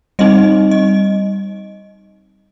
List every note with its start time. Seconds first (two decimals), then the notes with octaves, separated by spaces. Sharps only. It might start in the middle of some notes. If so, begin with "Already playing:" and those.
0.19 G3 C4 D#4 D#5
0.71 D#5